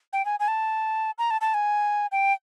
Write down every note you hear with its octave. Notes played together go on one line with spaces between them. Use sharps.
G5
G#5
G#5
A5
A#5
A5
A5
G#5
G5